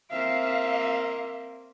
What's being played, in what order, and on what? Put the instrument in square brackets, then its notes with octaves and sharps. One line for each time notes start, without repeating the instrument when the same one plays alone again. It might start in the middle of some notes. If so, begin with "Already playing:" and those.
[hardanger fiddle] A#3 C4 [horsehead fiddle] E5 F5